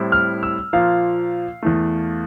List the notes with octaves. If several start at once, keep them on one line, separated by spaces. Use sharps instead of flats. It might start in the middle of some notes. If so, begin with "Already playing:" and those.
Already playing: A2 G3 C4 E4
F6
E6
A#2 F3 A#3 F5
E2 E3 A3